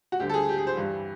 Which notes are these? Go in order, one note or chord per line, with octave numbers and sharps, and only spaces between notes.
F#4
D2 D3 G3 G4
A4
G#4
G4
G#4
C5
G2 E3 G3